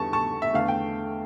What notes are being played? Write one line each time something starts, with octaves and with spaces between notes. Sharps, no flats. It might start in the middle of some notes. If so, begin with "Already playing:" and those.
Already playing: E2 D3 G3 A5 C#6
A5 C#6
E5
E2 D3 A3 F5
G5